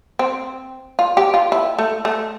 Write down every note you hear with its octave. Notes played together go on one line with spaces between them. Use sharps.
C4
F4
G4
F4
E4
A3
A3